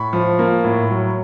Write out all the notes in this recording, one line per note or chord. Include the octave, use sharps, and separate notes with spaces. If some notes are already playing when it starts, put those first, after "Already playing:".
Already playing: A2 B5 C#6
F3
A#3
A2
F#3